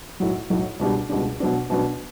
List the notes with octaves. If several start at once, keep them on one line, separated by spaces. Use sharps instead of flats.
B1 A2 F#3
B1 A2 F#3
C#2 B2 G3 D4
C#2 B2 G3 D4
B2 F#3 B3 D4
B2 F#3 B3 D4